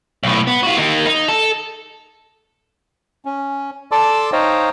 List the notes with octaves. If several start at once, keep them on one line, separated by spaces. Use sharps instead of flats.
B1 A2
B3
F4 F#4
A#3 D#4
D#4
A4
C#4
A4 D5 A5 C6 D6 E6
D#4 C5 C#5 D#5 F5 G5